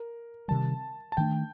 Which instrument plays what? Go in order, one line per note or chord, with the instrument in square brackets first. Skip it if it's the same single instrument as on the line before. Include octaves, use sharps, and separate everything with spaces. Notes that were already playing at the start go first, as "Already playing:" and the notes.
Already playing: [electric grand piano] A#4
[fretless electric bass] C3 D#3 G3 [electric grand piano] A5
[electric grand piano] A5
[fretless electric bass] D#3 A3 D4 [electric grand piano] G5